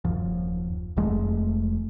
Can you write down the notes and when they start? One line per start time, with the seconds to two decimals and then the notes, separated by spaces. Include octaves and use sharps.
0.04 D#1 F#2 F3
0.97 F1 F2 G#3 A3